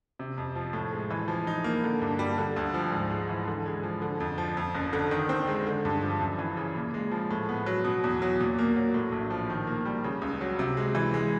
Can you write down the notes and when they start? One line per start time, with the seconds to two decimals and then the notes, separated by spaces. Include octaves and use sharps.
0.19 C3
0.38 F2
0.56 F3
0.73 A2
0.93 G#3
1.10 E3
1.28 F3
1.47 D#4
1.64 A#3
1.84 D3
2.02 G2
2.19 G3
2.38 D3
2.56 D2
2.74 F3
2.92 G#2
3.10 G#3
3.29 E3
3.48 D3
3.66 G#3
3.83 F3
4.02 D3
4.20 F2
4.38 F3
4.57 F2
4.74 F#1
4.93 D3
5.11 D#3
5.29 C4
5.47 G#3
5.67 D3
5.85 G2
6.02 F3
6.20 F#2
6.39 E3
6.57 C#3
6.76 A#2
6.94 G#3
7.11 F3
7.31 A2
7.49 B3
7.66 F#3
7.84 B2
8.04 E2
8.22 F#3
8.40 A#2
8.59 A#3
8.76 F#3
8.94 A2
9.12 A#1
9.30 F3
9.50 D#3
9.67 A#3
9.85 G3
10.04 C#3
10.22 C#2
10.41 F#3
10.59 C3
10.77 G#3
10.95 E3
11.14 G#3